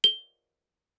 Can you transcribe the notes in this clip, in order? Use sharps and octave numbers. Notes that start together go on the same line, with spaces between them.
G7